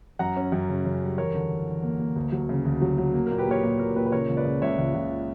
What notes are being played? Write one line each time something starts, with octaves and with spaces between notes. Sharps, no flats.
F#2 F#5 A#5
C#4
F#2
C#3
C#3
G3
E2 A#4 C#5
D3
E2
E2
A#3
A#3
D2
F#3
C#3
D2
F#3
F#3
A#3
A#4
A#2
G4 B4
A#3 A#4 C#5
A#2 G4
A#2 A#4
A#2 G4 B4
B4
C#3 A#4 C#5
C#2
B4 D5
C#3
C#2 C#5 E5
C#2
C#2